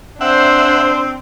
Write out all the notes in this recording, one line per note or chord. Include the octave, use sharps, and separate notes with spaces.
C4 D4 C5 E5 F#5